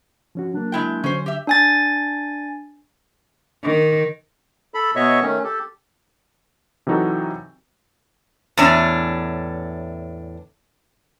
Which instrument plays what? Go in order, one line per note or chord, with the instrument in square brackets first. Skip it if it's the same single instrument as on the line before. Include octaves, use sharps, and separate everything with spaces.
[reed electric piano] F3 C#4 F#4
[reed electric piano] F#3 A#3 [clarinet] D4
[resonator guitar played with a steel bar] G#3 E4 G5
[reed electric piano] D3 F#3 [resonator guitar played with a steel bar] C#4 C5
[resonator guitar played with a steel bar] G4 E5
[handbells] D4 G#5 A6
[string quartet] D#3
[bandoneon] A4 B5
B2 B3 C#5 D#5 E5 C#6
D#3 A3 C#4
G4 A4
[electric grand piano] C3 E3 F#3 D#4 F#4 A4
[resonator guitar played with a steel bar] E2 A2 C#4 D4